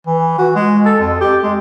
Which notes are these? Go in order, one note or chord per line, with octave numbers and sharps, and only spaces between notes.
E3
F#4
G#3
A4
F2
G4
G#3